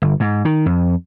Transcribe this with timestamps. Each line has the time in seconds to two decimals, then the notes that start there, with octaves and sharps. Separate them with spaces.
0.02 G1
0.20 G#2
0.45 D#3
0.66 F2